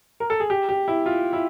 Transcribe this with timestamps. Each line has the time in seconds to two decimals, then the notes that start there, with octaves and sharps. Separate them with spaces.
0.20 A#4
0.30 A4
0.40 G#4
0.50 G4
0.69 G4
0.88 E4
1.06 F4
1.33 E4